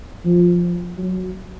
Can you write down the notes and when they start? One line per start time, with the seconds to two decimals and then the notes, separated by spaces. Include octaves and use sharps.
0.25 F3
0.98 F#3